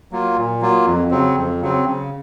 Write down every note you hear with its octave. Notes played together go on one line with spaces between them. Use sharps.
F#3 A#3 F4
A#2
F#3 A#3 F4
F2
C#3 F#3 C4
F2
C#3 F#3 C4
C#3